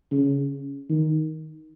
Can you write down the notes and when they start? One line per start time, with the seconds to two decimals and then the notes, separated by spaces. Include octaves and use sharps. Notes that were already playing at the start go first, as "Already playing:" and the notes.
0.11 C#3
0.90 D#3